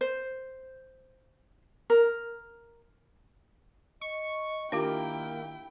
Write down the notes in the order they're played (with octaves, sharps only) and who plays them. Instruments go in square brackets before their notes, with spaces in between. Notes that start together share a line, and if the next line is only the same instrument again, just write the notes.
[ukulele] C5
A#4
[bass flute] D#5 [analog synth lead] C#6
[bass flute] D#3 [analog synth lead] A#3 [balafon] D4 F4 G4 [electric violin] E4 G5